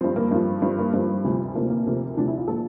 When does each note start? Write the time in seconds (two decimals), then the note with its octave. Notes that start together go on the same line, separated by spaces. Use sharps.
0.01 G2 F3 C4
0.16 A#3
0.31 G2 F3 C4
0.62 G2 F3 C4
0.79 A#3
0.93 G2 F3 C4
1.24 D2 C3 F3
1.55 D2 C3 F3 A#3
1.70 A#3
1.86 D2 C3 F3
2.17 D2 C3 F3 D4
2.28 E4
2.38 F4
2.48 A#2 F3 A4